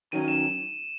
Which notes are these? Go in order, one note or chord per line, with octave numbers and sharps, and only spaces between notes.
D#3 F#3 C#4 D#7
E7